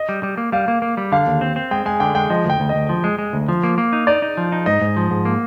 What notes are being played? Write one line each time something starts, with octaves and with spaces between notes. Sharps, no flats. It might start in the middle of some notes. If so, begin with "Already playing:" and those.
Already playing: D#5
G3
G3
A#3
G3 F5
A#3
A#3
G3
D3 F5
D#2
C4
C4
G#3 G5
G#3 G#5
D3 G5
G#3 G5
F3 D#5
D2
G5
D2
D#5
D2
F3
G#3
G#3
D2
F3
A#3
A#3
D#4
D#4 D5
D#4
F3
D#4
G#2 D#5
G#2
F3
G#2
A#3